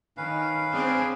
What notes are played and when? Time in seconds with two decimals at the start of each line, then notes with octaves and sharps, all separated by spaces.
0.17 D#3 C#4 B4 F5
0.74 C4 D4 G#4